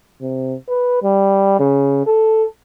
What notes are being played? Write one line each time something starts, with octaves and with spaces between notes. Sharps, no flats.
C3
B4
G3
C#3
A4